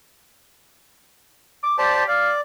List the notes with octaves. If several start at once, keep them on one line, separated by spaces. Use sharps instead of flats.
D6
G4 C5 D5 A5
D5 F5